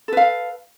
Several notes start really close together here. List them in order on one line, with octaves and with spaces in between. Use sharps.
A4 B4 F5